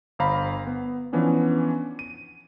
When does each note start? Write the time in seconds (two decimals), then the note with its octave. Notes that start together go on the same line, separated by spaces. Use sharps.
0.19 G1 C5 F5 A#5 B5
0.67 B3
1.13 E3 F3 B3 C#4 D4
1.99 D#7